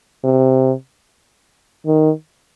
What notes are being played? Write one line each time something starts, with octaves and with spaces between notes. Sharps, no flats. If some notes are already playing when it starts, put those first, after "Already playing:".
C3
D#3